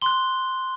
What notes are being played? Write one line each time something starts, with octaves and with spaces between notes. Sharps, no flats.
C6 F#6 G7